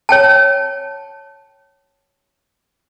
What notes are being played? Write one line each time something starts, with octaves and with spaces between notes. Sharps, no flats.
C#5 G5 A5